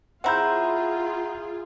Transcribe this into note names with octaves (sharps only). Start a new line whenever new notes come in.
C4 E4 F4 G#4 F#5 A#5 G6